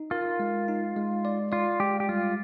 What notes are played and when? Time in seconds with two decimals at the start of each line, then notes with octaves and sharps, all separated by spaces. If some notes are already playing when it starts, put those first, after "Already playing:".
Already playing: D#4
0.11 F4 A#4
0.40 G#3
0.68 D#4
0.96 G#3
1.25 D5
1.52 F4 D5
1.80 G#3 G4
2.00 G4
2.09 G3 F4